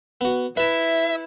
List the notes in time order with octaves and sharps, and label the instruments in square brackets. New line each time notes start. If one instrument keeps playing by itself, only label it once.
[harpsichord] B3 F#4
[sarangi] E4 [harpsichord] B4 A5 [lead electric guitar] E5